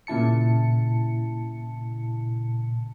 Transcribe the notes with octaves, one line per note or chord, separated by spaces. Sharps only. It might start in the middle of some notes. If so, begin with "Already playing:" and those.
A#2 C#3 E4 A5 C#7